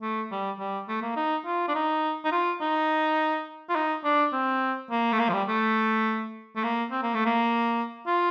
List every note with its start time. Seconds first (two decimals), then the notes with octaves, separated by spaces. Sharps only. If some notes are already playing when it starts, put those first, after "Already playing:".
0.02 A3
0.31 G3
0.59 G3
0.88 A3
1.02 A#3
1.16 D#4
1.46 F4
1.68 D4
1.75 D#4
2.25 D#4
2.32 F4
2.61 D#4
3.69 F4
3.76 D#4
4.04 D4
4.33 C4
4.91 A#3
5.13 A3
5.19 A#3
5.29 F3
5.33 G3
5.49 A3
6.56 A3
6.64 A#3
6.91 C4
7.03 A#3
7.14 A3
7.26 A#3
8.07 F4